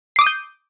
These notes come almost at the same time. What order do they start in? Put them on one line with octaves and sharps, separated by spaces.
C7 D6 D#6 D#7 G6